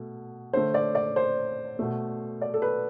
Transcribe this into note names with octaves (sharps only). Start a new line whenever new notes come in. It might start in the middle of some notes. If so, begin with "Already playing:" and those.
Already playing: B2 A3
D3 A3 C5
D5
D5
C5
B2 A3
D5
A4
B4